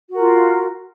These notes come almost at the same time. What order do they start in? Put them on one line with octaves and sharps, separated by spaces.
F#4 A#4 F4